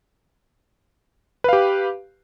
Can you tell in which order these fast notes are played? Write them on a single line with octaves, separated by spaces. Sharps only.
B4 F5 G4